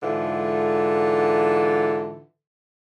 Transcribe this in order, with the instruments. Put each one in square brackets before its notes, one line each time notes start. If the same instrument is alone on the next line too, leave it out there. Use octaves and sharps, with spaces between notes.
[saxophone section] G#2 D3 E3 F4 A4